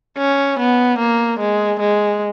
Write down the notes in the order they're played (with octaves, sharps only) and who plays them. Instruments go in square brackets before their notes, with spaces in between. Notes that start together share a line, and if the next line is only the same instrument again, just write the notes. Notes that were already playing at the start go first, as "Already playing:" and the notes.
[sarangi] C#4
B3
A#3
G#3
G#3